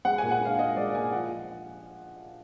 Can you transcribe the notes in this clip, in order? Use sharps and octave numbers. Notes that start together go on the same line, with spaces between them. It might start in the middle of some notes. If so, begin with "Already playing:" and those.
G#3 F#5
A#2 G#5
F#5
D4 F5
G#3 D#5
G#3 D5
A#2 G#5
F3 F#5